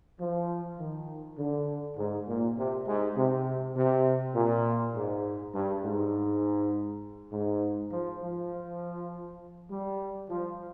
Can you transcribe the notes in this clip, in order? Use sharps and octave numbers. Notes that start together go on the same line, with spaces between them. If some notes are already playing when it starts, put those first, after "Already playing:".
F3
D#3
D3
G#2
A#2
C3
G#2
C3
C3
A#2
G#2
G2
G#2
G#2
F3
F3
G3
F3